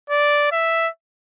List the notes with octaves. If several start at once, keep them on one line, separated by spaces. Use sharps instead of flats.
D5
E5